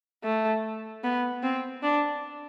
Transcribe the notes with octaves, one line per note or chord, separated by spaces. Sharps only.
A3
B3
C4
D4